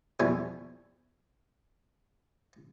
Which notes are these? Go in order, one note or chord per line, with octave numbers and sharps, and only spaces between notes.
F2 B2 E3 G3 A4 G#5